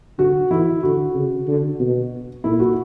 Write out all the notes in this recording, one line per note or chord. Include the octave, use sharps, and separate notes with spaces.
D3 F#4
E3 E4
D3 F#4
C#3
D3
B2
A#2 E4
F#4